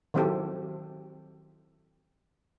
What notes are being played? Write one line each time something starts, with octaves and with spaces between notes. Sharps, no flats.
D#3 F#3 C4 E4 G4 A4